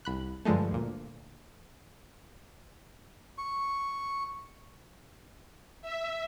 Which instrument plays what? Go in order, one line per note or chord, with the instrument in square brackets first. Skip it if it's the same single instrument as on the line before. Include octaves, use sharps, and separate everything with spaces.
[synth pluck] C2 B5 F#6
G2 D3 F3 G#3 A3
D2 A#2
[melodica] C#6
[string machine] E5